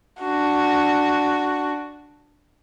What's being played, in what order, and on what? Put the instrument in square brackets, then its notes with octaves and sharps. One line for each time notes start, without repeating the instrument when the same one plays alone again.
[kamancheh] D4 F#4